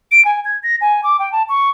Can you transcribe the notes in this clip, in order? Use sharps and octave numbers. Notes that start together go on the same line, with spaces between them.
D7
G#5
G#6
A#6
G#5
D6
G5
A5
C#6